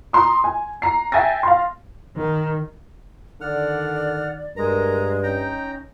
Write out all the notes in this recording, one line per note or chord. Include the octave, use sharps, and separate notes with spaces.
A#5 C6 D#6
G#5
A#5 C7
E5 G5 G#5 A6 A#6
F5 C6
D#3
D3 D#3 D5 F#5 F6
G2 G#3 A#4 A#5
C#4 D#4 G5 A#5